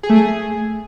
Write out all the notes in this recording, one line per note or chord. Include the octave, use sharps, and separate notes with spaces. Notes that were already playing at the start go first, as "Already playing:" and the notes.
G#4
A3
G#4